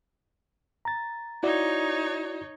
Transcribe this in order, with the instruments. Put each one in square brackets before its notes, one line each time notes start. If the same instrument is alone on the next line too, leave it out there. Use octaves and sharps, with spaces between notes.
[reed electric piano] A#5 A6
[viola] D#4 C#5 [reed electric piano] E4 F#4 D5